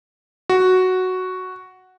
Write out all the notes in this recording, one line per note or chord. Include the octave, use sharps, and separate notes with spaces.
F#4